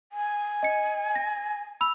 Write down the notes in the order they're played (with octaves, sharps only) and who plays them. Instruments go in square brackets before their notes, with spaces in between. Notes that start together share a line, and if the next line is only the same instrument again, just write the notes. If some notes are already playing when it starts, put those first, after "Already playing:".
[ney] G#5
[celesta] D#5 C#7
A#6
B5 E6 F7